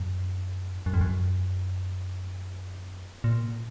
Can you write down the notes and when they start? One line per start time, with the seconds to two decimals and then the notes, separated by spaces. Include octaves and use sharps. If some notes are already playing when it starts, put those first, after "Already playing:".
Already playing: F#2
0.86 F#2
0.94 F2
1.01 F#2
3.24 A#2